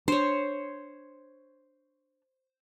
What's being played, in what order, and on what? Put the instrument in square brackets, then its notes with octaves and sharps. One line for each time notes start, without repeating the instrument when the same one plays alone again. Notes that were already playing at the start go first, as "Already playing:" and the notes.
[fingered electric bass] D4 [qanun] C5 C#5